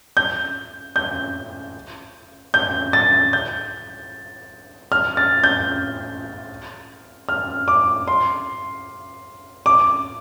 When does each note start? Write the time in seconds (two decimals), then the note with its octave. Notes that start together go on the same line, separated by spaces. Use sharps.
0.17 G6
0.96 G6
2.54 G6
2.93 A6
3.33 G6
4.92 F6
5.17 A6
5.44 G6
7.29 F6
7.68 D6
8.08 C6
9.66 D6